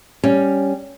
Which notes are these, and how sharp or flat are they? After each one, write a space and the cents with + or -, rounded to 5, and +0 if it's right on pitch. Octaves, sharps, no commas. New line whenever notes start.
G3 +0 C#4 +5